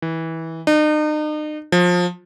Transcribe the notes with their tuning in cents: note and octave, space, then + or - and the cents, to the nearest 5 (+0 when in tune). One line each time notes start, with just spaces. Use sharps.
E3 -20
D#4 -40
F3 +25